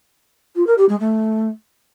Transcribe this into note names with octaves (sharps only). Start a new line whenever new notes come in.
F4
A#4
G4
G#3
A3